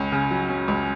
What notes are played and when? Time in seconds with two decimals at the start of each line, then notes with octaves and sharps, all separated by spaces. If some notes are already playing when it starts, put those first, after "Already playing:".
Already playing: C#2 C#4
0.12 C#3
0.31 F#3
0.48 C#4
0.68 C#2